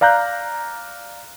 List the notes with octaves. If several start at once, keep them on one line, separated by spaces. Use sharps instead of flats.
D5 F5 A#5 F#6 G6